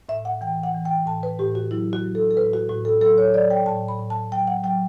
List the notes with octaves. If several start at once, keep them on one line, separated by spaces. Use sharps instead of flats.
A2 E5
F#5
E3 G5
F#5
E3
G5
A2 A5
B4
A2 G4
F#4
F#3 E4
F#4
F#3
A4
A4
A2 B4
F#4
A2 F#4
A4
F#3 A4
C#5
F#3 D5
G5
A2 A5
B5
A2
A5
F#3 G5
F#5
F#3 G5